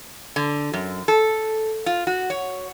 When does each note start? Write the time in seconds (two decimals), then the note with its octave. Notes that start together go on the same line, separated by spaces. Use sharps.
0.36 D3
0.74 F#2
1.08 A4
1.86 F4
2.07 F#4
2.30 C#5